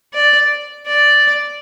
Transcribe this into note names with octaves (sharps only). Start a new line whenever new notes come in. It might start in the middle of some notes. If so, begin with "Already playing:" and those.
D5
D5